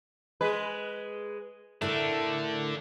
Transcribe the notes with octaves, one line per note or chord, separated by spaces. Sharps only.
G#3 B4
A2 D3 A3 D4 E4 A#4